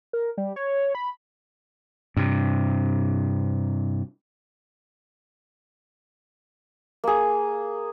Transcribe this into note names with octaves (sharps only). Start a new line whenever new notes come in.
A#4
G3
C#5
B5
G2 C3
A#3 G#4